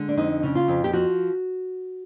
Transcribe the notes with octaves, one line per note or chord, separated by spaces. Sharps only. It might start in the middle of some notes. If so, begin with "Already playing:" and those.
Already playing: D3 G#3
D4
F2 D#4
C#3
F4
F2
G4
F3 F#4